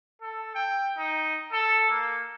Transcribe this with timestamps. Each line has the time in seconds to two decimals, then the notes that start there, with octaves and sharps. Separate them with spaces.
0.22 A4
0.55 G5
0.98 D#4
1.53 A4
1.90 A#3